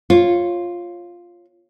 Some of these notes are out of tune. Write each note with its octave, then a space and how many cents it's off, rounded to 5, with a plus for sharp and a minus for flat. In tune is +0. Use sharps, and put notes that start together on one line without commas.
F4 +0 C#5 -20